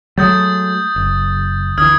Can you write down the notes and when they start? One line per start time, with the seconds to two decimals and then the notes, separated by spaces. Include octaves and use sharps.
0.18 F#3 G#3 A3 D#6 G6 A6
0.96 F#1
1.78 D2 E3 D#6 F6 G#6